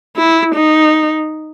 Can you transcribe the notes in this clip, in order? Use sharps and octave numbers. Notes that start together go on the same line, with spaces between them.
E4
D#4